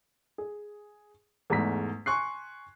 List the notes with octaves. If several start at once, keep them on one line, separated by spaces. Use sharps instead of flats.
G#4
E2 G#2 A3 A#5 B6
G#5 C6 C#6 F#6 C7